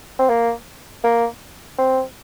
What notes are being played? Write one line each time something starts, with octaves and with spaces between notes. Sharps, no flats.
C4
A#3
A#3
C4